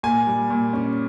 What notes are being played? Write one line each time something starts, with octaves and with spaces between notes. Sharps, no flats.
A#2 G#5
G3
A#2
C#4